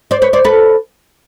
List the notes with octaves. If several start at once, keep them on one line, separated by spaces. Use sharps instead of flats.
C5 D5
B4 C#5
C5 D5
A4 B4